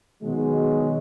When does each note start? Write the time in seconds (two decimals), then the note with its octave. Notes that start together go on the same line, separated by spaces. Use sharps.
0.23 B2 D#3 F#3 G#3